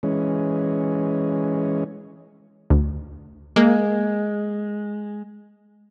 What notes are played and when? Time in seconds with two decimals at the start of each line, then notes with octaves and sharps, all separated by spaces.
0.03 E3 G#3 C#4
2.70 D2
3.56 G#3 A#3